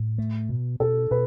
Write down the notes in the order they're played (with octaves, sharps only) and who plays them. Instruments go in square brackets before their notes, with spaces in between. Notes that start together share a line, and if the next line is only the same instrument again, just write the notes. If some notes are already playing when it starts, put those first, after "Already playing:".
Already playing: [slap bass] A2
A3
B2
[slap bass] B2 [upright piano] A4
[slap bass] B2 [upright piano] B4